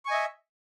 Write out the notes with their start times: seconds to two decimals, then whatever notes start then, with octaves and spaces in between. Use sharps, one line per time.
0.05 C#6
0.08 G#5
0.11 D#5
0.13 E5